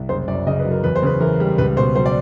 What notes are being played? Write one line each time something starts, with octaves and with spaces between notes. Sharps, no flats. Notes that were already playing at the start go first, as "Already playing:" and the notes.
Already playing: C2
F#1 C5
F#2 D5
C#3 D#5
B4
F#3
A#4
E2 B4
C5
C#3 B4
E3 A#4
G3
C#2 B4
B2 C5
F#3 C5
D5